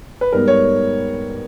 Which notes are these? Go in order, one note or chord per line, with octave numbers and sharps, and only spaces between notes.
B4
G#2 G3 B3 A#4
C#5